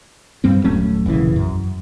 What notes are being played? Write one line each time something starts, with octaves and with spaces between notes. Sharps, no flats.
G2 G3 C4
D#1 F#3 A3 C#4
E1 A#1 C#3 E3
F#2